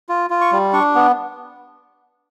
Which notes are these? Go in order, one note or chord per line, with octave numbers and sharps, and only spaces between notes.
F4
F4
C#6
G3
D4 C#6
B3